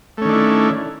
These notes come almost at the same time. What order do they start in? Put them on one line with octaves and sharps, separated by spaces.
A3 C#4 D#3 D4 E4